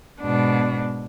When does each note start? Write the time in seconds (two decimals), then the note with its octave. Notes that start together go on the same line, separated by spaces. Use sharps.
0.20 G#2 B2 D4